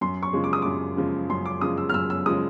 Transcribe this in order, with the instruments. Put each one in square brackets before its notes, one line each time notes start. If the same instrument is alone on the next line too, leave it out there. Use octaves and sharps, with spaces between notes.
[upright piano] F#2 C6
C#6
C#3 F3 G#3
D6
D#6
F#2 D6
C#3 F3 G#3
F#2 C6
D6
C#3 F3 G#3 D#6
E6
F6
F#2 E6
E6
C#3 F3 G#3 D#6